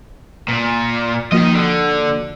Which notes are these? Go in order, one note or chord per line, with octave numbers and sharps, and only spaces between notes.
A#2
D#3 F3 A#3 F#4 D#5
D3